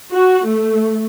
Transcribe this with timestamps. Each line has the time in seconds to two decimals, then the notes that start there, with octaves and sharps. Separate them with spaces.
0.11 F#4
0.46 A3